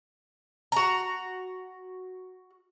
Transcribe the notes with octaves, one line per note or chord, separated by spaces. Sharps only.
F#4 A#5